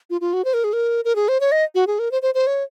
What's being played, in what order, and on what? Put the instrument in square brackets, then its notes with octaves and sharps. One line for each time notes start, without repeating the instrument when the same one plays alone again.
[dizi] F4
F4
F#4
C5
A#4
G#4
A#4
A#4
G#4
C5
C#5
D#5
F#4
G#4
A#4
C5
C5
C5
C#5